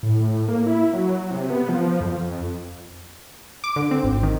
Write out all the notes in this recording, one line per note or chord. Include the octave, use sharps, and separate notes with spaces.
A2
A#3
E4
F#3
C3
B3
F3
F2
D6
D3
C4
G#1
D#3